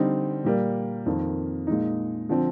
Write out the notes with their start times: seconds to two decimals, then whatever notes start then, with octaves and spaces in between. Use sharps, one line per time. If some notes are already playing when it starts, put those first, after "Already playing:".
Already playing: D3 G3 C4 D#4
0.44 A#2 G3 A#3
1.06 F2 D#3 A#3
1.67 A#2 G#3 D#4
2.29 D3 F3 C4